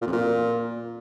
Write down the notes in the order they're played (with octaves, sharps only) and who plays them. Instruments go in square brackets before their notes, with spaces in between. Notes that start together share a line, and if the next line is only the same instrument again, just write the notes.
[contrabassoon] A#2
F2
A#2